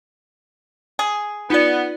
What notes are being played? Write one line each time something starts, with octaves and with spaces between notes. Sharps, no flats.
G#4
B3 D#4 F4 D5